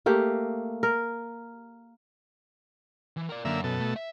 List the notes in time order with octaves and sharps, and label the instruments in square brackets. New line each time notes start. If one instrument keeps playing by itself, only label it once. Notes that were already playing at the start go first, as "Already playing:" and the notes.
[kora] A3 A#3 G4
A#4
[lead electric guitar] E3
A#4 D5
[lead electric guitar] F#2 [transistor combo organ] D3 A#3 E5
[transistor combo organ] B2 A4
[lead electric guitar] A3
E5